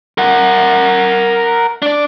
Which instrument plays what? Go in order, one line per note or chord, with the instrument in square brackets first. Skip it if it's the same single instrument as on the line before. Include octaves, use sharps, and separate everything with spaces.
[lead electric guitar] A#4 F#5
D4 D5